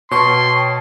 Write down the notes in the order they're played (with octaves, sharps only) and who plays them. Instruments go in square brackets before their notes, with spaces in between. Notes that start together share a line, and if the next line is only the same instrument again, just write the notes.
[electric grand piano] B2 A5 [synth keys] C#5 G5 C#6 [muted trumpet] C6